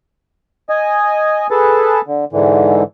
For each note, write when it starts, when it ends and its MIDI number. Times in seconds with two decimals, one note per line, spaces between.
0.69 1.47 75
0.69 1.47 80
1.51 2.01 68
1.51 2.01 69
1.51 2.01 71
1.51 2.01 81
2.07 2.25 50
2.33 2.83 44
2.33 2.83 50
2.33 2.83 52